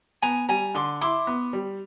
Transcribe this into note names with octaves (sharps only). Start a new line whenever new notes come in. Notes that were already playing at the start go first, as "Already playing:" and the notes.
B3 G#5 A#5
G3 G#5 A#5
D3 C6 D6
E4 C6 D6
B3
G3